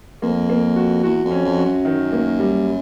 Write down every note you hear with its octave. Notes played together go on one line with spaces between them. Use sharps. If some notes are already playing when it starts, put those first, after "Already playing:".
F2 A#3
A#3
F#4
E2 F#4
F2
C#4
F2
F#4
F#2
D#3
A#3
G3